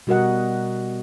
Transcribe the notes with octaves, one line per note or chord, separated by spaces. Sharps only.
B2 G3 F#4 A#4 D#5 F#5